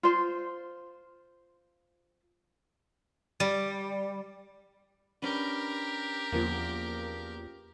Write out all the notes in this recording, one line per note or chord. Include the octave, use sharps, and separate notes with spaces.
F4 C5
G3
C#4 D4 G4 A#4 B4
E2 F3 A#3